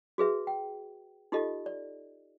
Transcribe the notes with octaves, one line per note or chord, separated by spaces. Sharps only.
F#4 G#4 B4 E5
G5
D#4 F4 G4 A4 D#5
D5